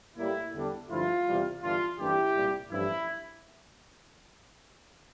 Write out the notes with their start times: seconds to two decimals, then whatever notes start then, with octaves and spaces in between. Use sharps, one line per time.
0.17 A2 G3 A#3 E4
0.53 E2 D3 G3 D4
0.89 G2 D3 F3 A3 E4 F4
1.25 E2 C3 E3 G3
1.62 G1 G2 E3 G3 D4 F4
1.98 A1 G2 E3 A#3 D4 E4 G4
2.34 C2 A#2 G3
2.70 A1 G2 F3 E4